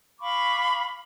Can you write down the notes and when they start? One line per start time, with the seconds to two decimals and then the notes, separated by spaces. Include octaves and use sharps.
0.20 F5 B5 C#6 D6